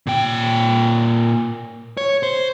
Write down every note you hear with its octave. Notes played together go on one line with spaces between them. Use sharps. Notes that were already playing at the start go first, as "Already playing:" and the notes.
A#2 G5
C#5
C5